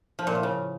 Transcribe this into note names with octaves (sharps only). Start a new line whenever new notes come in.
F3
A#2
A2
C#3